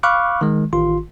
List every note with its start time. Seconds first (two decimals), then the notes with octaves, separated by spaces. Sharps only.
0.03 F5 B5 C#6 D6 F6 F#6
0.41 D#3 G#3
0.73 A1 D#3 F4 C6